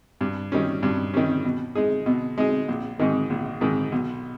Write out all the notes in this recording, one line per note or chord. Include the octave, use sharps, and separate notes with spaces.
G2
D#3 G3 C#4
G2
D#3 G3 C#4
B2
G#3 D#4 G#4
B2
G#3 D#4 G#4
A#1
G#2 D#3
A#1
G#2 D#3
B1